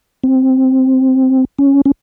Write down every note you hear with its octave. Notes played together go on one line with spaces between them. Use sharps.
C4
C#4
C#4